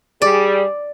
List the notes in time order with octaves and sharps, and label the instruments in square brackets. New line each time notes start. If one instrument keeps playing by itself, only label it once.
[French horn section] G3 G#4 [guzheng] D5